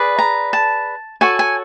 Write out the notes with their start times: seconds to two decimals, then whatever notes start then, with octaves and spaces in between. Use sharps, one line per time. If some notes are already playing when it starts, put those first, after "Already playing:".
Already playing: G#4 B4 D5
0.19 A#5
0.53 A5
1.21 F#4 A4 C#5 G#5
1.39 G#5